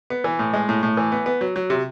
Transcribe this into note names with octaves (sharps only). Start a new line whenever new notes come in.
B3
E3
A2
G#3
A2
A2
E3
B3
B3
F#3
F#3
C3